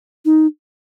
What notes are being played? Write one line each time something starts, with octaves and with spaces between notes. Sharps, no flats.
D#4